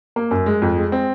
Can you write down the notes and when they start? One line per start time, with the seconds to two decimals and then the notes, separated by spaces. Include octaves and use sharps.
0.16 A#3
0.31 F#2
0.46 G#3
0.62 F2
0.77 G#3
0.92 C4